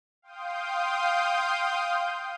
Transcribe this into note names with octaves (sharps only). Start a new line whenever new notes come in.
F5 G5 C6 D#6 G6